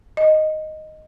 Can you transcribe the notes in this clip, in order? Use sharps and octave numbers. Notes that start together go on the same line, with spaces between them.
D#5